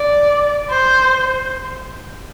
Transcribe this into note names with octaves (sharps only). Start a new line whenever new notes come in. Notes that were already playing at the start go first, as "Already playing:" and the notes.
Already playing: D5
C5